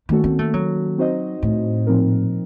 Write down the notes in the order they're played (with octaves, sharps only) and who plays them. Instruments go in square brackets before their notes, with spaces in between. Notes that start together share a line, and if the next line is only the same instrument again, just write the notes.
[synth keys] D#3 A#3 C#4 F#4 A4 [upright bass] A3
[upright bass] C4
A3
F#3
[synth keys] C4 D#4 F#4 C5 D#5
[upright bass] A2
[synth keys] A#2 F3 C4 D#4 A#4